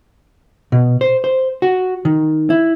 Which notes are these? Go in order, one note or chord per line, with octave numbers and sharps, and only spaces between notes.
B2
C5
C5
F#4
D#3
E4